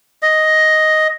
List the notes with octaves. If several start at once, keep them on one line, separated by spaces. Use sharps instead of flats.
D#5